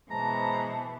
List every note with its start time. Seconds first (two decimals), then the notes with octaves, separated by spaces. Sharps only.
0.11 B2 E3 G#3 C5 A5 A#5